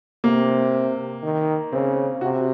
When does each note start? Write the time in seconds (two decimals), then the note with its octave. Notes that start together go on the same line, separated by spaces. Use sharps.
0.24 C3 A#3
1.23 D#3
1.73 C#3 C4
2.21 C3 F#4